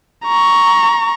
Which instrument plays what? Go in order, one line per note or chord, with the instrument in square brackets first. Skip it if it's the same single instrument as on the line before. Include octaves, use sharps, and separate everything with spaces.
[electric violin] A#5 C#6